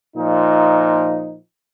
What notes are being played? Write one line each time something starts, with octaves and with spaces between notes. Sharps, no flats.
A#2 F3 D#4